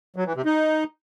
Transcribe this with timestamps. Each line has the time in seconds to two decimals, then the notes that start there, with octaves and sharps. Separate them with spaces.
0.16 F#3
0.26 E3
0.36 C3
0.45 D#4